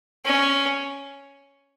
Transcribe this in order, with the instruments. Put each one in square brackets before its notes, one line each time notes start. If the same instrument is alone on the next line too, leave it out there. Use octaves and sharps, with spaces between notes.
[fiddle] C#4